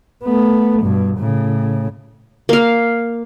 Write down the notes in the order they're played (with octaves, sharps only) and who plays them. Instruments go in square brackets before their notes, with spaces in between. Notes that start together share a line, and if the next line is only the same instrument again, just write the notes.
[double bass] A3 B3
G2 B2
A2 C#3
[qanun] A#3 F5